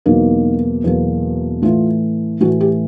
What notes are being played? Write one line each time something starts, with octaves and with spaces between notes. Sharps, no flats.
E2 B2 F#3 A#3 D#4
E2 B2 F#3 A#3
A2 E3 A3 F4
A2 E3 A3 F#4
G4